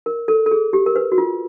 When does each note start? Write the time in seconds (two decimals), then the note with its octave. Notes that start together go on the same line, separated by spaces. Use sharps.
0.06 A#4
0.28 A4
0.46 A4
0.51 G#4
0.73 G4
0.86 A#4
0.96 B4
1.12 F#4
1.18 F4